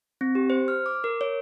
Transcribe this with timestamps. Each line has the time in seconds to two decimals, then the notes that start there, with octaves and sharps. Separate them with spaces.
0.21 C4
0.35 G4
0.50 C5
0.68 F6
0.86 D6
1.04 A#4
1.21 C#5